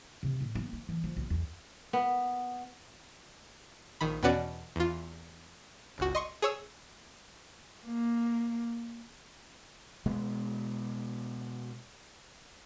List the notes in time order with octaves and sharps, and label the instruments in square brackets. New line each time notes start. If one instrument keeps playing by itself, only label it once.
[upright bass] C3
A2
B3
E4
E3
F3
B1
E2
[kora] B3
[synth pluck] A#1 D#3 B5
E2 B2 B3 C#4 F#4 D5
E2 F4
G1 C#2 F#4
D#5 C6 C#6
G#4 C#5 E6
[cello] A#3
[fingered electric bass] B2 G#3 B3